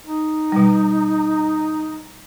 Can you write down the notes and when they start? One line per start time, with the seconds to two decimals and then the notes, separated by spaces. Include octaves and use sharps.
0.04 D#4
0.52 B2 G3